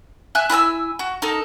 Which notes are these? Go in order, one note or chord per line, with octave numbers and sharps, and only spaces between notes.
E5 G#5 F#6
E4 G#5 A5 E6
F#4
D#4 A4 A#4